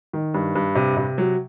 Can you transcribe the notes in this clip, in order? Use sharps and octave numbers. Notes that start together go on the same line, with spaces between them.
D#3
G2
G2
C3
C3
F#3